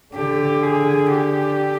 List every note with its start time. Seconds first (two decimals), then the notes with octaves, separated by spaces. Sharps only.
0.15 D3 G4
0.63 G#4
1.11 G4